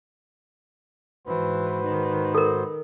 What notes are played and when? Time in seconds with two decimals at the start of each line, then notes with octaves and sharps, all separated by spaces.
1.27 G#2 E3 F#4 B4 C5
1.84 D#3
2.35 A4 A#4